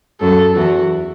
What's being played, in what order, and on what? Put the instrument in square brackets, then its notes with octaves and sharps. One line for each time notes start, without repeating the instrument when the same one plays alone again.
[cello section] F#2 F#3 [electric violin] A4
[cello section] E2 E3 [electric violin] F#4